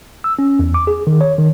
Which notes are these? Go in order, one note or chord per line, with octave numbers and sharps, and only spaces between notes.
E6
C#4
E2
D6
G#4
D#3
C#5
D#3